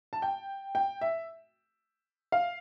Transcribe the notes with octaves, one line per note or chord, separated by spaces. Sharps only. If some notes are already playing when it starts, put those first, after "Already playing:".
A5
G5
G5
E5
F5